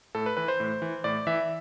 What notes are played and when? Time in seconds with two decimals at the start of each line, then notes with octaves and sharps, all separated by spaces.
0.15 A2 A4
0.26 B4
0.37 E3 B4
0.48 C5
0.60 A2
0.82 E3
1.04 A2 D5
1.27 E3 E5